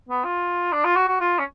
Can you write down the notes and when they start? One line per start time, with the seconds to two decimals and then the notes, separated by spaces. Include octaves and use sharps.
0.09 B3
0.25 F4
0.72 D4
0.84 F4
0.96 F#4
1.08 F#4
1.20 F4
1.39 C#4